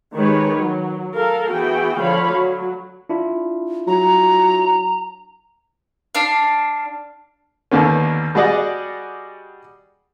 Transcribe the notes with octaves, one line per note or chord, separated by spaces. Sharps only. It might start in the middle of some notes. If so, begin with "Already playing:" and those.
D#3 G#3 G4 B4 C#5
F#3
A4 A#4 F5
E3 B3 F#4 G#4 G5
D3 F3 C#5 F5 B5
F#3
D4 E4 F4
F#3 A#5
D4 F5
D#2 D3 A#3 B3 C#4
G3 F#4 G#4 D5 D#5 F#5